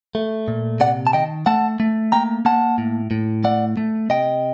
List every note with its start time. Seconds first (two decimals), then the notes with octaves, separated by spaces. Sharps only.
0.15 A3
0.48 A#2
0.80 C3 D5 F#5
1.07 A5
1.13 D#3 D#5 G5
1.46 A3 F#5 A5
1.80 A3
2.12 A#3 G5 A#5
2.45 A#3 F#5 A5
2.78 A2
3.11 A2
3.44 A3 D5 F#5
3.77 A3
4.10 C3 D#5 G5